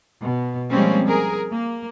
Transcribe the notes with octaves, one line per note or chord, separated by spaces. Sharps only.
B2
F3 G3 G#3 A#3 C4 C#4
G#4 A#4
A#3